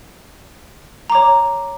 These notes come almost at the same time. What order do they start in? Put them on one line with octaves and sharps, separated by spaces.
A#5 D6 C#5